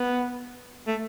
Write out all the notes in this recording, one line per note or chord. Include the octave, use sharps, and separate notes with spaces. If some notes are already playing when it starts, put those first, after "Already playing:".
Already playing: B3
A3